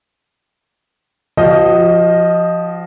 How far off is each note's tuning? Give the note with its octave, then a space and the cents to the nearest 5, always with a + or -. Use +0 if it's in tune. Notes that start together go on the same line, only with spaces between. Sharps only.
F3 +0 F#4 +45 D#5 +0